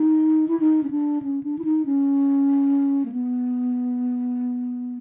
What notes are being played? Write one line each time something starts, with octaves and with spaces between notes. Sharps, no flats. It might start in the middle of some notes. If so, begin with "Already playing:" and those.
Already playing: D#4
E4
D#4
C#4
D4
C#4
D4
E4
D#4
C#4
A#3
B3